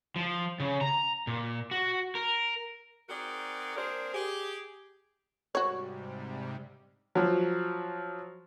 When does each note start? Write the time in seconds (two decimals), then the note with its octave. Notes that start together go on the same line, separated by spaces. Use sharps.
0.16 F3
0.60 C#3
0.81 A#5
1.27 A#2
1.71 F#4
2.15 A#4
3.09 C4 D#4 F#4 G#4 A#4 D5
3.76 A#3 C4 D4 G#4 A#4 C5
4.14 G4 G#4
5.55 G#2 C3 G3 F#4 C#5
7.15 F3 F#3